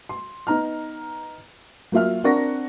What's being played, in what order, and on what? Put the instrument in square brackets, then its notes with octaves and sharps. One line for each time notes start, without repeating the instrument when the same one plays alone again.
[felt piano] C6
B3 D#4 A#5 F6
F#3 A#3 F4 E5 F6
C4 D4 A#4 F#5 C#6 A#6